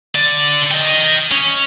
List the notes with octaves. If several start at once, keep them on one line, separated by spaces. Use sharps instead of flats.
D3 D5
D#5 G5
C#4